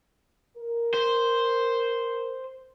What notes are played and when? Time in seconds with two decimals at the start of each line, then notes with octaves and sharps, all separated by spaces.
0.56 A#4
0.94 C5